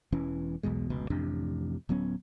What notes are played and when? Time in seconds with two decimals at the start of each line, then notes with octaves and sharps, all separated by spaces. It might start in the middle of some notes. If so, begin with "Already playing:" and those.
0.12 E1 E3 C#4
0.63 B1 E2 B2 G#3
0.90 F1 C#2 B2
1.10 A1 F2 C3 D4
1.89 D1 F#3 B3 C#4